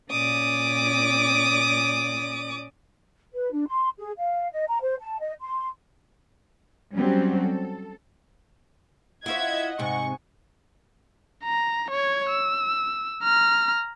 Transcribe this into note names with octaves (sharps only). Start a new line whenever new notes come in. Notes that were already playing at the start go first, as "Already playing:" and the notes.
A#2 C#4 D5 D6 D#6
B4
D4
C6
G#4
F5
D#5
A#5
C5
A5
D#5
C6
F#3 G3 C4 C#4 F#4 G4
A4
E4 F4 C#5 D#5 E5 F#5 G#6
G#2 C3 G#5 C#6
A#5
C#5 G#6
E6
A#5 F6